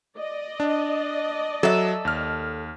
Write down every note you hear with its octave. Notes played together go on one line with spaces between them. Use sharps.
D5 D#5
D4
F#3 A4 E5
D#2 F6